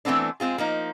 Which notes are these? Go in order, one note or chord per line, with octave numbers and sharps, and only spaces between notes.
E3 A3 B3 C4 D4
G#3 C4 F4 G#4
F3 A#3 D#4